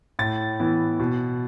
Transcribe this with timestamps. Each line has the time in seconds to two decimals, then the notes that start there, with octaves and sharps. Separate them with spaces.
0.19 A2 A6
0.60 E3 B3 E4
1.00 B2